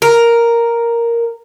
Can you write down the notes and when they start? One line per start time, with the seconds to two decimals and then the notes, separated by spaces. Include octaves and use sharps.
0.02 A#4